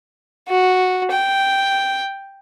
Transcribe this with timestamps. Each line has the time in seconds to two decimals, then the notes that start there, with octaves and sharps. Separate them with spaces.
0.49 F#4
1.11 G5